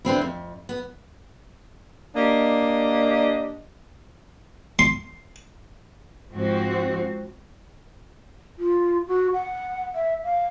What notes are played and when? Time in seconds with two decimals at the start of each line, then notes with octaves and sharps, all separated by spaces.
0.05 D3 B3 C4 E4
0.21 F2
0.69 B3
2.15 A#3 D4 G4 D#5
4.79 C6
6.32 G#2 F3 C4 F#4
8.58 F4
9.08 F#4
9.33 F#5
9.95 E5
10.24 F5